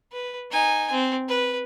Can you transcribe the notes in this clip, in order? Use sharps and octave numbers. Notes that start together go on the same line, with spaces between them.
B4
D#4 G#5
C4
B4